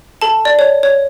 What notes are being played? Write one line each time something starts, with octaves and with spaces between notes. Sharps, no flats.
A4 A5
D5
C#5
C#5